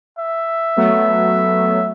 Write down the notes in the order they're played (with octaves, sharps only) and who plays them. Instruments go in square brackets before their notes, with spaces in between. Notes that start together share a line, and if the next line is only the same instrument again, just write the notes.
[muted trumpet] E5
[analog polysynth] F#3 A3 B3